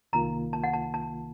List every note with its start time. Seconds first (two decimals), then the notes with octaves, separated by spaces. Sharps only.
0.13 C2 C3 D#3 A#3 F4 A#5
0.53 A5
0.64 F#5
0.73 A5
0.94 A5